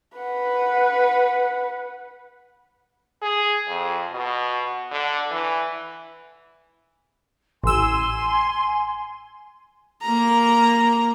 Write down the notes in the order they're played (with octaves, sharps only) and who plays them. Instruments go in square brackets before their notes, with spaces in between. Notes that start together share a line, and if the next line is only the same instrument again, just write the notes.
[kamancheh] B4 F#5
[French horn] G#4
F2
B2
D3
E3
[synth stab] A1 E6 [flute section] G#5 C6
[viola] A#3 A#5